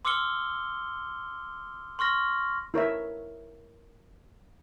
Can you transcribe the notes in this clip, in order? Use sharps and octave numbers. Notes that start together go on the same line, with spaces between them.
C6 D6 E6 F6 C#7 G7
C6 C#6 F6 A#6
E4 A#4 C#5 E5